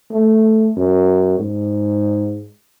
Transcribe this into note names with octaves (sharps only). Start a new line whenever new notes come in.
A3
F#2
G#2